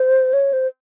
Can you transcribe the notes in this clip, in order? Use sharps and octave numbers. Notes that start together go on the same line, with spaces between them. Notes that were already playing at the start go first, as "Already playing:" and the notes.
Already playing: C5
C#5
C5